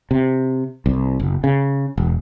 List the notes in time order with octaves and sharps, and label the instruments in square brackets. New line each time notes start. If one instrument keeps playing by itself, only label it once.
[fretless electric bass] C3
C2
F#1
C#3
E1